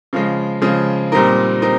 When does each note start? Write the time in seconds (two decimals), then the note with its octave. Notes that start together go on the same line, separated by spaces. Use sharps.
0.13 C#3 F3 G#3
0.62 C#3 F3 G#3
1.12 A#2 G3 C4 D#4 A#4
1.62 C4 D#4 A#4